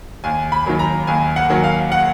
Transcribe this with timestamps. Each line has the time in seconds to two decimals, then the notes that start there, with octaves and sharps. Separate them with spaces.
0.24 D#2 G#5
0.52 B5
0.66 D#3 F#3 A#3
0.79 A#5
1.07 D#2 G#5
1.36 F#5
1.50 D#3 F#3 A#3
1.64 F5
1.92 F#5